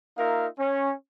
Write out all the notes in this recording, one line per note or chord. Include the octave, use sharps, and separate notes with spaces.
A#3 D#4 F4 A#4 E5 F5
C#4